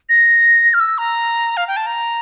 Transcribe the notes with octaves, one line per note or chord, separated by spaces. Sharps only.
A#6
F6
E6
A#5
F5
G5
A5
A#5